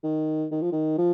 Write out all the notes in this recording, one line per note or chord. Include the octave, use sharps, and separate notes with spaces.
D#3
D#3
F3
D#3
F3